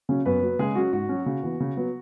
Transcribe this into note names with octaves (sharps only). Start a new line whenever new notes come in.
C#3 F#3 C#4
F#2 B3 B4
F#3 B3
C#3 G#3 G#4
F#3 C#4 F#4
G#2 F#4
F#3 C#4
C#3
E3 B3
C#3
F#3 B3